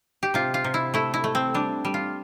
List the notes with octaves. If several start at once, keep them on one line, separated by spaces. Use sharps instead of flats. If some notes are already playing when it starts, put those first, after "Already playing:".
G4
C3 F4
F4
C3
E4
A3 E4
E4
A3
C4
G3 D4
G3
F4